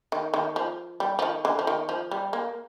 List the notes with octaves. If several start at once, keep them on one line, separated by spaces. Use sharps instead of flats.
D#3
D#3
F3
G3
F3
D#3
D3
F3
D#3
F3
G3
A#3